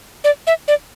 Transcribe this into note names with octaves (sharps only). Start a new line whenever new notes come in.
D5
E5
D5